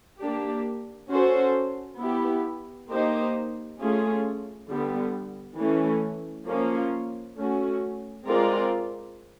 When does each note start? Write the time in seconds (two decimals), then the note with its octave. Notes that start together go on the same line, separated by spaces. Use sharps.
0.20 A#3 D4 G4
1.10 C#4 F#4 A4 C5
2.00 B3 E4 G4
2.89 A#3 D#4 G4 C5
3.79 A3 C#4 F4 G#4
4.69 D3 G3 B3
5.58 E3 A3 C#4
6.47 F3 A#3 C#4 F4
7.37 A3 C#4 F#4
8.27 G#3 C4 F4 A#4 D5